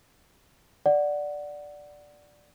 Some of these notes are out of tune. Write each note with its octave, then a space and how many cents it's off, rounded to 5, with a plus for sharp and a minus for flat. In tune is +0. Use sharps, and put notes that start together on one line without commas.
D5 +0 F#5 +0